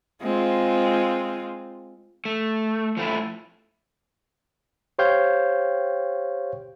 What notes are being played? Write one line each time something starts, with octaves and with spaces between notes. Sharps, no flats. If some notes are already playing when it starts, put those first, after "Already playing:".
G#3 C4 F4
A3
F3 A3 E4
G4 C5 C#5 F5 G5 G6